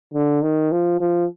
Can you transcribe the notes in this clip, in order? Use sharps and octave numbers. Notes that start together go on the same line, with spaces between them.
D3
D#3
F3
F3